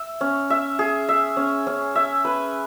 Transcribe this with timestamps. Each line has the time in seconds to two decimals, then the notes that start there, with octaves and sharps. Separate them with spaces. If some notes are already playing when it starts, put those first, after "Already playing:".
Already playing: E5
0.21 C#4
0.50 E5
0.79 G#4
1.09 E5
1.37 C#4
1.67 C#4
1.95 E5
2.25 B4